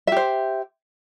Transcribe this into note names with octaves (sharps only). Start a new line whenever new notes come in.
G4 C5 E5